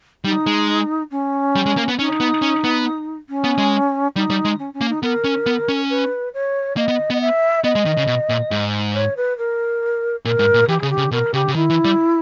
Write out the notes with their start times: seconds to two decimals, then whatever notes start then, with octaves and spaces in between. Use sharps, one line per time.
0.24 G3 D#4
0.47 G#3
1.11 C#4
1.56 G3
1.66 G#3
1.77 A#3
1.88 B3
1.99 C#4 D#4
2.20 B3
2.42 C#4
2.64 B3
3.30 C#4
3.44 B3
3.58 G#3
4.16 G3 D#4
4.30 G3
4.45 G#3
4.59 C#4
4.74 C#4
4.81 A#3
4.89 D#4
5.03 B3 A#4
5.24 C#4
5.46 B3
5.69 C#4
5.90 B4
6.34 C#5
6.77 A#3 D#5
6.88 B3
7.10 B3 D#5
7.21 E5
7.64 B3 D#5
7.75 G#3
7.86 D#3
7.97 C#3
8.07 B2
8.29 A#2
8.51 G#2
8.94 C#5
9.17 B4
9.38 A#4
10.25 A#2 A#4
10.39 G#2
10.54 A#2
10.68 E3 G4
10.81 C#3 G#4
10.90 G4
10.98 C#3
11.11 B2 A#4
11.34 C#3 G4
11.48 C#3
11.55 D#3 E4
11.70 E3
11.85 G3